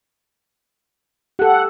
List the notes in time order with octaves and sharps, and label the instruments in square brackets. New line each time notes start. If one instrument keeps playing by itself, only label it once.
[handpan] G4 A4 [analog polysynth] F#5